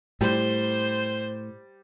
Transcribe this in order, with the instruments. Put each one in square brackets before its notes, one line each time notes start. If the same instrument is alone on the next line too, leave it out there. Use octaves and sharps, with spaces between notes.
[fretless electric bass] A2 [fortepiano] G3 [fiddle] C5